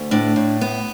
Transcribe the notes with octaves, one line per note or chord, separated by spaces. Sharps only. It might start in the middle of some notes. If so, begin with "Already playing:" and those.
Already playing: D2
A2 D4
A2
B3